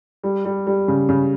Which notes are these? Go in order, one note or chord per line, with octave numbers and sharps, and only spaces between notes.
G3
G3
G3
C#3
C#3